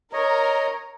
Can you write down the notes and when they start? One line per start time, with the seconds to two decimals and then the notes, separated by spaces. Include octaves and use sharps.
0.13 A#4 C#5 D#5